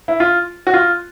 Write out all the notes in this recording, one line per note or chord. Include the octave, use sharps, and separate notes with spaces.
E4
F4
F#4
F4